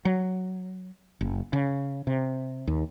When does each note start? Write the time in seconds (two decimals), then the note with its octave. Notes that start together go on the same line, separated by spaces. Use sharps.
0.05 F#3
1.21 F#1
1.53 C#3
2.07 C3
2.67 D#2